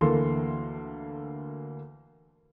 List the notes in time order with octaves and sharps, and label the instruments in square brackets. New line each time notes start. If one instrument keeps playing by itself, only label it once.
[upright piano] D2 E3 A#3 A4 C6